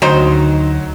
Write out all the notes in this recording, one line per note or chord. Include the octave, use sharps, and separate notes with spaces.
D2 D#3 F#3 D#4 C5